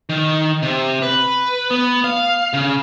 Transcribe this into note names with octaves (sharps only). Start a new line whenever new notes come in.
D#3
C3
B4
B3
F5
C#3